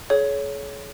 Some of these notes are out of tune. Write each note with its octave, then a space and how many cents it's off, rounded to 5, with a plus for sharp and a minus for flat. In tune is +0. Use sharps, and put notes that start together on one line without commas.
G#4 +40 C#5 +15